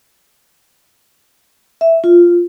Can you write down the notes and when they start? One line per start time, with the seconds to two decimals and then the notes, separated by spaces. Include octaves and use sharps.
1.81 E5
2.04 F4